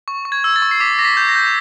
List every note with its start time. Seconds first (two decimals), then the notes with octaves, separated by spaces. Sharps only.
0.08 C#6
0.25 C#6
0.32 G#6
0.44 E6
0.56 A6
0.62 C#6
0.71 C7
0.80 D6 B6
0.99 D6 A#6
1.05 B6
1.17 G6
1.29 A#6
1.36 G6